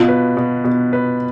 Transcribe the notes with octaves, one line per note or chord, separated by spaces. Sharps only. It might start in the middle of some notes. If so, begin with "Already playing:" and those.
Already playing: B2 F4
B4
B2
B2
B4